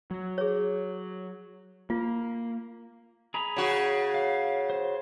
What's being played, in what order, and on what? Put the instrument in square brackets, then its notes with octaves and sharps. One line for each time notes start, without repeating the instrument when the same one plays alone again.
[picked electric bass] F#3
[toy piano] G#4 C#5
[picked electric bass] A#3 [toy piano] F4
[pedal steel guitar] G#4 A#5 B5
[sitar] C#3 F#4
[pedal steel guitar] F5
C5